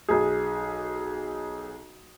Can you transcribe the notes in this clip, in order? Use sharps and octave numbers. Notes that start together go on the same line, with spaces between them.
B1 G#4